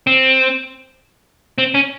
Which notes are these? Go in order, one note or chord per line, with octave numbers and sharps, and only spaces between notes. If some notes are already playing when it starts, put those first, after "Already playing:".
C4
C4
C#4